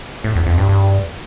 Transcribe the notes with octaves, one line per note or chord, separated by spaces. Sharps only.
A2
E2
F2
G2
G2